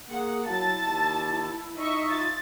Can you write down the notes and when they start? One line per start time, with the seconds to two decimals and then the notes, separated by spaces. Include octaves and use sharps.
0.10 A#3 G#4 F#5
0.48 F#3 E4 A5 A6
0.87 D#2
1.77 D#4 D#5 E5 C#6
2.11 F4 A6